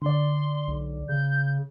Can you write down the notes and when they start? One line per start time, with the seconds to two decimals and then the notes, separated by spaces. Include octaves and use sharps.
0.02 D3 D5 C6
0.68 B1
1.09 C#3 G6